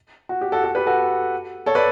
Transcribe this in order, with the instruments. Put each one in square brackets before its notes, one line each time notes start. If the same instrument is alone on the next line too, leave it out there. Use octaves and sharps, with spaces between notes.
[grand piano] F#4
G4
F#4 A4
F#4 A4
G4 B4
F#4 A4
A4 C#5
B4 D5